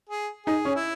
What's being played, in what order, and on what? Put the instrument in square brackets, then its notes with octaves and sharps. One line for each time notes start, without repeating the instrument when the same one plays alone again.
[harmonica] G#4
[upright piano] D#4 [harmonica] G#4
[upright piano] C#4
[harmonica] E4